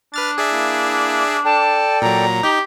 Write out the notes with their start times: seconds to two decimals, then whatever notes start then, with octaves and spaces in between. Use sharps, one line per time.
0.14 D4 B4 F6 A6
0.38 G#4 D5 E5
0.51 A#3 E4
1.45 A4 D5 G5 A5
2.02 A#2 F#3 A#5
2.43 D#4 G4